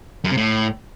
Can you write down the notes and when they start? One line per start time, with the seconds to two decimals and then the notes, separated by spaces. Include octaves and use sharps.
0.24 F#2
0.31 C3
0.37 A2